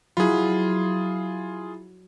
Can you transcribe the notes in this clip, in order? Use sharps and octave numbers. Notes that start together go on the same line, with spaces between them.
F#3 E4 F4 G#4 B5